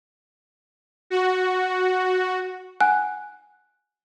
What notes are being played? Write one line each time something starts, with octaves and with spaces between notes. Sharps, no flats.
F#4
F#5 G#5 F#6